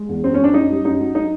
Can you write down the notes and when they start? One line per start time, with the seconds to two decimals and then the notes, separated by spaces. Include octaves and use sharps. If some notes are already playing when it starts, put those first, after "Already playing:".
Already playing: G#3
0.09 E2
0.24 F#2 C4
0.34 C#4
0.39 F#2 D4
0.54 F#2 D#4
0.70 G3
0.84 F#2 D#4
1.00 F#3
1.15 D#4